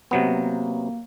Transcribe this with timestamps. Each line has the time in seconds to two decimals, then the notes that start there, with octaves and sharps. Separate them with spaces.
0.11 C3 F#3 A#3 B3